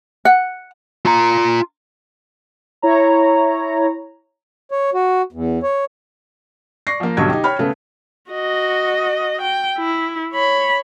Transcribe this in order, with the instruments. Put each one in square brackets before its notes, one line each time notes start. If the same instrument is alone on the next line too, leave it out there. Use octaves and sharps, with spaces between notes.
[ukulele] F#5
[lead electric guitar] F4 A#5
[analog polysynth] E4 C#5 A#5
[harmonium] C#5
F#4
E2
C#5
[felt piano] D5 C#6 A#6 C7
F3 A#3
B1 G2 D3 F#3 C#6 G#6
D#4 G4
C#5 G5 B5 F6
C#3 A3 B3
[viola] F#4 D#5
G5
E4
C#5 B5